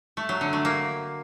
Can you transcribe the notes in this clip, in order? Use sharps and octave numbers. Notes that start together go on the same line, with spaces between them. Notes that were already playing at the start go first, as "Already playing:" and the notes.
A3
F#3
D3
A3
A#3